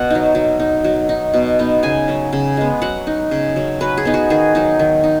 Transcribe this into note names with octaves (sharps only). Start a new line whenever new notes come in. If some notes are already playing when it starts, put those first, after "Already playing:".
Already playing: B2 F#5
F#3 D#4
F#3
D#4
F#3
D#4
B2
B3 D#4
C#3 G#5
F#3 C#4
C#3
G#3 B3
F#3 F#5
D#4
C#3
F#3 C#4
F#3 B4
G#4
B3 D#4
F#4
D#3 G#4
F#3 D#4
D#3
D#4